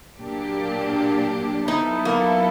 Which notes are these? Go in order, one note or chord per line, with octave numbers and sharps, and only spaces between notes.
A#2 F#3 A#3 D4 G4
F#3 B3 D#4 E4 A4
A#3